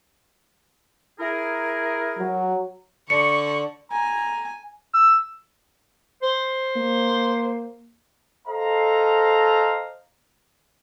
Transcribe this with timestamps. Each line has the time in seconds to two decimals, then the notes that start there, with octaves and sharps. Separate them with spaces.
1.20 E4 G#4 A#4
2.19 F#3
3.10 D3 D5 C#6 C#7
3.91 G#5 A#5
4.94 E6
6.22 C5
6.77 A#3
8.48 A4 C5 D#5 F5 A#5